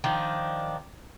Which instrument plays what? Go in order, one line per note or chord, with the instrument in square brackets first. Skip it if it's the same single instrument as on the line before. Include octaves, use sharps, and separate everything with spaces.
[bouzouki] D#3 F3 D4